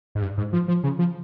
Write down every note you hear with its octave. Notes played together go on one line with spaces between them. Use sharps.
G#2
G2
G#2
F3
F3
C#3
F3